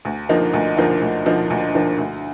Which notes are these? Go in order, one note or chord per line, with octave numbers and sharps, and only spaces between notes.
D2
D3 F3 A#3 D#4
D2
D3 F3 A#3 D#4
D2
D3 F3 A#3 D#4
D2
D3 F3 A#3 D#4
D2